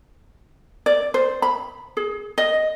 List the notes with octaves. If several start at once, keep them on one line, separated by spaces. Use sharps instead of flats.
D5
C5
B5
G#4
D#5